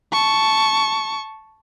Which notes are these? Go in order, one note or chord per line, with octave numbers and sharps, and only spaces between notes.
A5 C#6